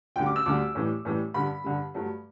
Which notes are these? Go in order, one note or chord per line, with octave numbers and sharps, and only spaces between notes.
D2 D3 G3 G5
D6
E6
D2 D3 G3 D6
A2 E3 G3
A2 E3 G3
G2 D3 G3 B5
G2 D3 G3
G2 F#3 A3